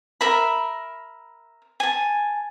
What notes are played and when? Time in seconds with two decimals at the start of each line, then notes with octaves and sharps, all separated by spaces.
0.21 A#4 E5 B5
1.80 G#5 A5